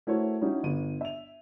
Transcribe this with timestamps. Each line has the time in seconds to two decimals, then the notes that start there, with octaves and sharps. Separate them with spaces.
0.07 A3 E4 F#4 A#4 C5 C#5
0.41 G3 C#4 D#4 E4 F#4
0.63 G1 D#7
1.01 E5 F7